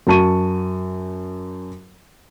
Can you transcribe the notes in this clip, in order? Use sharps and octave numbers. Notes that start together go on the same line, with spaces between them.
F#2 F#4 A5 C#6 D#7